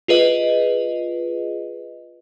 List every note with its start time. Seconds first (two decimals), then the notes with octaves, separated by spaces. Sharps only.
0.08 F4 G#4 B4 D#5